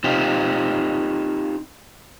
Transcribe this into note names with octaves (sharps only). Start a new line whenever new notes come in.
C4 D#4 F4 G4